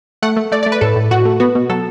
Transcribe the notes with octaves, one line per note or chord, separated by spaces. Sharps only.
A3 F#5
A3
A3 D5
A3 D5
B4
A2 A4
A2
A2 F#4
A3
B3 F#4
B2
F#3 A4